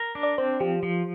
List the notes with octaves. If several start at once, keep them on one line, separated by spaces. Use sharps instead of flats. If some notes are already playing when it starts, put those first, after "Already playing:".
Already playing: A#4
D4
D5
C4 C5
F3 G4
F3